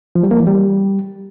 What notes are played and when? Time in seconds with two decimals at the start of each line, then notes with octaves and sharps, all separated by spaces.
0.15 F3
0.23 G3
0.31 A#3
0.39 E3
0.47 G3